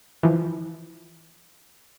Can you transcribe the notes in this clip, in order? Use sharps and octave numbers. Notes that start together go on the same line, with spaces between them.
E3 F3